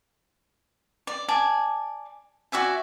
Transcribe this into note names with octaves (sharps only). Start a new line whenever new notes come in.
D5
D5 G#5 A5
F#4 D5 E5 G#5